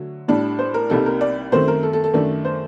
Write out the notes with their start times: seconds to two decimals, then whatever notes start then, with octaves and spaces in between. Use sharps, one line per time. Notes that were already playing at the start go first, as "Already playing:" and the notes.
Already playing: D3 F#3 A3
0.28 A2 G3 D4
0.59 C5
0.74 A#4
0.90 C2 C3 G3 A#3 D#4 A4
1.06 A#4
1.21 D5
1.52 F#2 D#3 A3 C4 C5
1.68 A#4
1.83 A4
1.93 A4
2.04 A4
2.14 F#2 D#3 A3 D4
2.45 C5